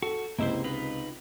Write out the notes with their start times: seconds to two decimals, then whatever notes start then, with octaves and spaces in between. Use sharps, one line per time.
0.02 F#4 A4
0.39 C#2 C3 A#3 E4 C5 D#5
0.64 D#4 F4 B4